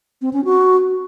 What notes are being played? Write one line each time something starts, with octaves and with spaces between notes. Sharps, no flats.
C4
C#4
F#4